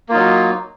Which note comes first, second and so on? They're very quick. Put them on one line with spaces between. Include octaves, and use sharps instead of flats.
A#3 F4 D#4 F#3